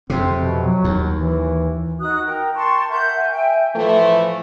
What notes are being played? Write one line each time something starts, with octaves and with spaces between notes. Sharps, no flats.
F2 C3 C4
B2
F#3
D#2
E3
D#4 F#4 D#6 F#6
A#4 G5
G5 A5 C6 C#6
A#4 E5 F#5 G6
G#5
E5 G5 G#5
A2 E3 F3 A3